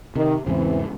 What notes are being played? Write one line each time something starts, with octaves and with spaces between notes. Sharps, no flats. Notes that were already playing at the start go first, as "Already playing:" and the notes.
C3 D#3
E2 G#2 C#3 E3 C4